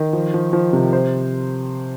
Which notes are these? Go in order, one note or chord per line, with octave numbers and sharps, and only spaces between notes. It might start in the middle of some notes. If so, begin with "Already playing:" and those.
Already playing: D#3
F3
F3
F3
C3
C5